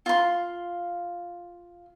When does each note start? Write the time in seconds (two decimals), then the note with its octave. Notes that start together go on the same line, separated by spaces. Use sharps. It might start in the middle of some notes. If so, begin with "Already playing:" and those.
0.06 F4 C6